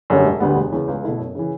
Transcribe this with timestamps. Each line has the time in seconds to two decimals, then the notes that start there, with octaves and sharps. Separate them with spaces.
0.10 F#2 D3 G3 C#4
0.25 E1
0.40 D2 D3 G3 B3
0.56 E1
0.72 E2 C#3
0.88 C#2
1.03 B2 A3 E4 A4
1.19 F#2
1.35 C#3 E3